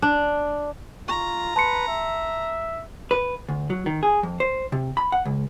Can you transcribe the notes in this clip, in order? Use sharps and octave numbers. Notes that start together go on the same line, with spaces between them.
D4
F4 A#5 C#6
B4 A5 C6 C#7
E5
B4
D2
F#3
D#3
G#4
F2
C5
C3
B5
F#5
C#2